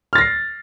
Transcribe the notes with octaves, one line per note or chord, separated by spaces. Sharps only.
F6 A6 A#6 C7